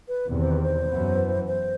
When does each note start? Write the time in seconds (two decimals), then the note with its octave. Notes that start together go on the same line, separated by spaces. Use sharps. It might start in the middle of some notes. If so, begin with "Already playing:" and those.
0.08 B4
0.29 E2 C3 D#3
0.40 C5
0.51 B4
0.62 C5
0.88 F#2 E3 B3
1.48 C5